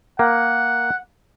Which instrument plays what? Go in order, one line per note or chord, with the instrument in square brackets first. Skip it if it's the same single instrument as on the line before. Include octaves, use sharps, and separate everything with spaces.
[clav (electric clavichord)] A#3 [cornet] F#5